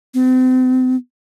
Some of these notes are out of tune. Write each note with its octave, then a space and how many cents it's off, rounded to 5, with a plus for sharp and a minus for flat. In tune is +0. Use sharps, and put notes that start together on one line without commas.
C4 -35